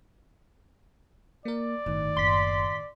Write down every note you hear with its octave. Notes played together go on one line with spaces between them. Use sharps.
A#3 A#4 D5
G1 A2 D#3
F#1 C6 B6